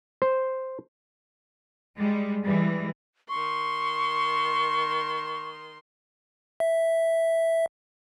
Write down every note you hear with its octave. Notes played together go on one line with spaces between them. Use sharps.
C5
G3 G#3
E3 G3 G#3
D#3 C6 C#6
E5